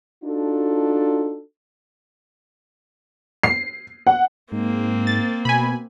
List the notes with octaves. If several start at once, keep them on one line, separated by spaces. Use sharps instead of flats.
D4 D#4 F4 F#4 A4
C7
F#5
G#2 A#3 C4
A6
B2 G#5 B5